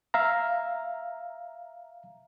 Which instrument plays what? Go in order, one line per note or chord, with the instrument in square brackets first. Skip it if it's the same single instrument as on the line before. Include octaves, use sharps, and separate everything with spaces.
[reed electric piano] E5 F5 A#5